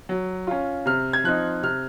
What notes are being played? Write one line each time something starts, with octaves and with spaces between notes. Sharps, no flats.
F#3
C#4 F4
C3 F6
G#6
F3 C4 D#4 F#6
C3 F6